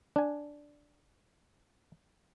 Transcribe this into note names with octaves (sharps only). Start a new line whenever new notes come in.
D4 G#5